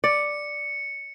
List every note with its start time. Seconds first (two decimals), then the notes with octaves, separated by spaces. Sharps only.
0.04 D5 C#7